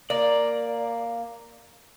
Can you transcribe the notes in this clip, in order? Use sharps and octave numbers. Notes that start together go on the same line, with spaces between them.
A#3 D5